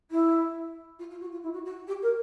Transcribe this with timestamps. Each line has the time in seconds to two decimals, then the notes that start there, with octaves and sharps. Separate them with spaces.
0.11 E4
0.99 F4
1.10 F4
1.20 F#4
1.32 F4
1.43 E4
1.53 F#4
1.65 F#4
1.87 G4
2.02 A#4